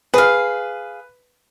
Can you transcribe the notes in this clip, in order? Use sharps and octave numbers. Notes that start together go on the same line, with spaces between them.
G#4 B4 F5